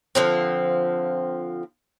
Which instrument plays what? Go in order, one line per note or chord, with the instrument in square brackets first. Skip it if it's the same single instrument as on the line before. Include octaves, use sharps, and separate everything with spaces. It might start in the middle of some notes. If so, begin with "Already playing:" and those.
[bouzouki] D3 F3 C4